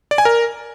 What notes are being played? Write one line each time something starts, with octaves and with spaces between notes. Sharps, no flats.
D5
G#5
A#4